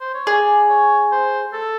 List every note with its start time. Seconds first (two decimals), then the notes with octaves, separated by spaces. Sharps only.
0.01 C5
0.14 C#5
0.27 G#4 D5
0.69 C#5
1.12 C5
1.53 A4